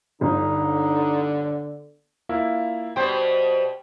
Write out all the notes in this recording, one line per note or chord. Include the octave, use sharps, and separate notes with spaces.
G1 D3 D#4
A#3 E4 F4
B2 G3 C5 G5